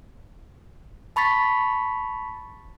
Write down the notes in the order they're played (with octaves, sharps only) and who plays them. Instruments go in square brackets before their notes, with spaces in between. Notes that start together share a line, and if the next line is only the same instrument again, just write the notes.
[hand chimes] A5 B5 C#6 A6 B6